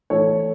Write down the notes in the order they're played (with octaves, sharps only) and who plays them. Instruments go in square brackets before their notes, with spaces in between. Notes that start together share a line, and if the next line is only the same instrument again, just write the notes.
[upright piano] A2 E3 A4 C#5